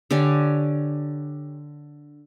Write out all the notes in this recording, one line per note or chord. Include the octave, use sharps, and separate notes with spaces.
D3 G4 C#5 G#5